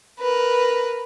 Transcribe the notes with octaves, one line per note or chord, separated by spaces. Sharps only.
A#4 B4